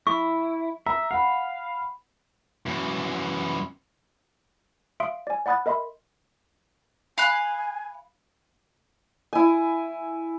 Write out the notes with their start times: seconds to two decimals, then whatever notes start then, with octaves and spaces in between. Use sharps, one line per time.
0.07 E4 C#6
0.86 E5 A#5
1.11 F5 F#5 B5
2.66 F#2 E3
5.00 E5 F5 C6 D#6 D7
5.27 D5 G#5
5.46 D5 F#5 B5 D#6 F#6 A6
5.66 A#4 D#5 E5 B5 C6
7.18 F5 G#5 B5 F#6
9.33 E4 G#5